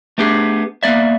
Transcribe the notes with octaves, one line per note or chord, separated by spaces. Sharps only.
A3 B3 D4 G4 G#4
A#3 B3 D5 E5